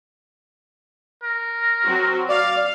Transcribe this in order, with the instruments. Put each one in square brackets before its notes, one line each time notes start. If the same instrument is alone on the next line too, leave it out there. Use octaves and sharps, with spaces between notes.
[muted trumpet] A#4
[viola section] F#3 C4 F#4
[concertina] D5 [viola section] F5